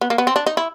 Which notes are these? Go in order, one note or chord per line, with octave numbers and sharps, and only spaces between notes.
B3
A#3
B3
C4
D4
D#4
E4